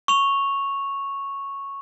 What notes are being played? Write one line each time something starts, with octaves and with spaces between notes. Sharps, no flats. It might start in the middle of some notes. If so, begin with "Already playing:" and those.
C#6 F7